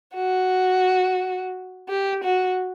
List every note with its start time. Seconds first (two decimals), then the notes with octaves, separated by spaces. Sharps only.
0.16 F#4
1.89 G4
2.24 F#4